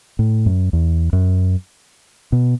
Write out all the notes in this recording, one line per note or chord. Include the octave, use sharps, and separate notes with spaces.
A2
F#2
E2
F#2
B2